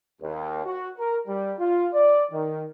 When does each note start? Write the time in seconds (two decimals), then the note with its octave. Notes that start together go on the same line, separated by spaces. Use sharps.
0.22 D#2
0.65 F#4
0.98 A#4
1.27 G3
1.59 F4
1.93 D5
2.31 D#3